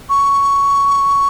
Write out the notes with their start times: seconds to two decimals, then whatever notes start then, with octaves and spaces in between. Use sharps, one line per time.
0.09 C#6